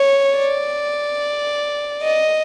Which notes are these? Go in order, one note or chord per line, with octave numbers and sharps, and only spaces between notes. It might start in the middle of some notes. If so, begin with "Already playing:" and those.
Already playing: C#5
D5
D#5